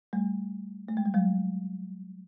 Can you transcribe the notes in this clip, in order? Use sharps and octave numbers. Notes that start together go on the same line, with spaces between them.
G3 A3
A3
G#3
G3
F#3 G#3